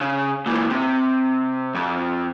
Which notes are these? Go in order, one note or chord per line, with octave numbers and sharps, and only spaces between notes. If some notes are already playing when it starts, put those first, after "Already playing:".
C#3
A#2 E3
C3
F2